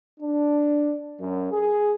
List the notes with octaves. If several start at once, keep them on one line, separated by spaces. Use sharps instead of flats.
D4
F#2
G#4